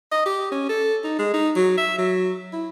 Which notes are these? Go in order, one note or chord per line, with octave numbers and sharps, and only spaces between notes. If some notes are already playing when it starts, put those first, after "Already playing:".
D#5
G4
C#4
A4
D#4
G#3
D#4
F#3
E5
F#3
E4